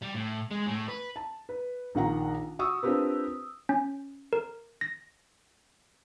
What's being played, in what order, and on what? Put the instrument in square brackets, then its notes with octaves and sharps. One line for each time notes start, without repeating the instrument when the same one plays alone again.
[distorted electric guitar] G3
A2
G#3
A2
B4
[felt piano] A5
B4
A#1 D#3 F#5 A#5
F#4 C#6 D#6 E6
C4 D4 F4 G4 A#4 B4
[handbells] C#4
A#4
A#6